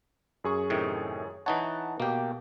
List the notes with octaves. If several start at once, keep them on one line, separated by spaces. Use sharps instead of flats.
F#2 G#4 C#6
A2 C3 D#3
E3 D#4 C#5 F#5 A5
B2 A#3 G4